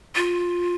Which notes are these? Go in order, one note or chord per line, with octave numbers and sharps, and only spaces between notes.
F4